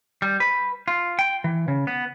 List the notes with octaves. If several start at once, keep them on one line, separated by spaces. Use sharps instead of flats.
G3
B4
F4
G5
E3
C#3
B3